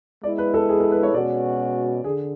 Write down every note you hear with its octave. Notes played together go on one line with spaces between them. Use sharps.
G#3 B3 E4 D5
B4
A4
G#4
A4
B4
C#5
B2 G#3 C#4 F#4 D5
D3 G#4